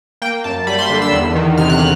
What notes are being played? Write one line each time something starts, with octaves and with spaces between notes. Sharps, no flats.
A#3 G5
F#2 A5
G3 B5
C6
D3 C6
E6
E2
D#3
C3 F6
F#6